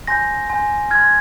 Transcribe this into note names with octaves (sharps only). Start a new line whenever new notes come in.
G#5 C6 G6 A#6
G#5 C6 G6
C6 F6 G#6